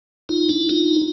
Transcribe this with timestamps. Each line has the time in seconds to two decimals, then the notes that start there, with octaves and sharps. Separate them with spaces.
0.29 D#4 F4
0.49 D4 E4
0.69 D#4 F4